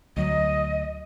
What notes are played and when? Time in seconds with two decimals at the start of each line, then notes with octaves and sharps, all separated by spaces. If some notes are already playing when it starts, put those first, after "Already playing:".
0.17 D2 F#3 D#5